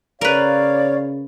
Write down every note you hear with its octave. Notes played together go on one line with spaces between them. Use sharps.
C#3 A#4 B4 C#5 D5 F5